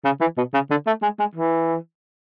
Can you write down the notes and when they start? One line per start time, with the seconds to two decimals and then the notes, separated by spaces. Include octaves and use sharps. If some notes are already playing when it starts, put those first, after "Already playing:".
0.05 C#3
0.21 E3
0.37 B2
0.54 C#3
0.71 D3
0.87 A3
1.03 G#3
1.20 G#3
1.36 E3